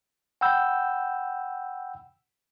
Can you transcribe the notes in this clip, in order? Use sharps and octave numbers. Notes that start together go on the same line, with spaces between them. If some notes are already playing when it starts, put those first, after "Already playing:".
F#5 G5 B5 E6 G6